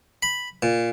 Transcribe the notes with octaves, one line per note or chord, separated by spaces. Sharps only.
B5
A#2